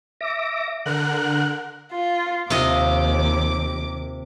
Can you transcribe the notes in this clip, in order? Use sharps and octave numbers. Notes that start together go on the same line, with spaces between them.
E5 D6 A#6
D3 A#4 F#5 F#6
F4
D#2 C3 F4 D#5 D6